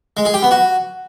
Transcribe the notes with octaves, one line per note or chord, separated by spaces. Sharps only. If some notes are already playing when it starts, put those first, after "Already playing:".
G#3
G#4
G4
B3
F#4